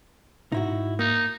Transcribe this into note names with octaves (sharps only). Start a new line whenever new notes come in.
G#2 D#4 E4 F#4
A#3 D#4